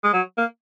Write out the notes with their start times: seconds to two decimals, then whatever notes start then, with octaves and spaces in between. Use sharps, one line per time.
0.04 G#3
0.13 F#3
0.38 A#3